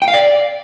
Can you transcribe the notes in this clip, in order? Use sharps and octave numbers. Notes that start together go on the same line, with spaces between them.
G5
F5
D5